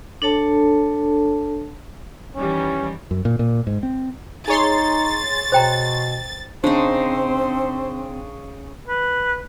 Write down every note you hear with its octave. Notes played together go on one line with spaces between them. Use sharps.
D4 A4 C#5 A5
D#3 E3 G3 C#4
F#2
A#2
A#2
G#2
C4
D#4 G#4 C#5 C6 A6
B2 C5 G5 A#5
C#3 C4 D4 D#4 C5
B4